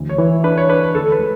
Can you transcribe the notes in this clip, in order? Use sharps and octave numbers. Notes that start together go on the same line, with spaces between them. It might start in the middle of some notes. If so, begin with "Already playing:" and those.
Already playing: D2 E3
C#5
E3
D4 B4
C#5
D4 B4
D2 A4
B4
G#3